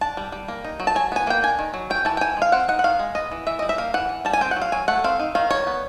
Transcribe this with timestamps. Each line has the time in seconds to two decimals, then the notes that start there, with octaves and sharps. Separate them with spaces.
0.01 D4 A5
0.17 G3
0.32 G3
0.48 A#3
0.64 D#4
0.80 F#3
0.87 A5
0.95 F#3 G#5
1.12 B3 G#5
1.27 A#3 G5
1.43 D4 G#5
1.59 D#3
1.74 F#3
1.90 C#4 G5
2.05 E3 A5
2.17 G5
2.21 E3 G#5
2.37 G#3 F5
2.52 C4 F#5
2.68 D#4 F#5
2.79 F#5
2.84 D#3 F5
2.99 G#3
3.15 B3 D#5
3.31 E3
3.47 E3 E5
3.59 G3 D#5
3.69 E5
3.78 A#3 F5
3.94 E3 F#5
4.09 E3
4.25 G3 A5
4.33 G#5
4.41 C4 G5
4.51 F#5
4.56 F#3
4.62 F5
4.72 F#3 G#5
4.88 A3 F#5
5.04 C4 F5
5.19 D#4
5.35 D#3 F5
5.51 G3 C#5
5.67 B3